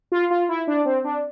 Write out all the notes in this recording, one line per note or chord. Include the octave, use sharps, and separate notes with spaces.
F4
F4
E4
D4
C4
D4